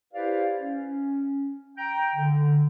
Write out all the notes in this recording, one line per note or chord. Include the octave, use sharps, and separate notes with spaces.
E4 G4 B4 C5 D5 F5
C#4
G5 A#5
D3